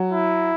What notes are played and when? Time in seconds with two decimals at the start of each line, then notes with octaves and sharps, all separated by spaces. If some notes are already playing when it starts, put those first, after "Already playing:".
Already playing: F#3
0.12 E4